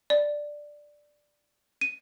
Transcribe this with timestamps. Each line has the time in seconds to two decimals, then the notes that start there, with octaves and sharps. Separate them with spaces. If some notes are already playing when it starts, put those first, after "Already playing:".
0.10 D5
1.81 D#7